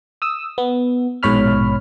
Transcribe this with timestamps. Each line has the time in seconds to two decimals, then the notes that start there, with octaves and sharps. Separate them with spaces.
0.22 D#6 E6
0.58 B3
1.23 A#1 G#2 B2 C#5 B5 F6